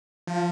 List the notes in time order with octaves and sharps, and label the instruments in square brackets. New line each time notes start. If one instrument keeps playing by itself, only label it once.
[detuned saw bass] F3